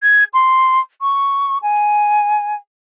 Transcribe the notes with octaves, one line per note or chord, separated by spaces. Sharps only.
G#6
C6
C#6
G#5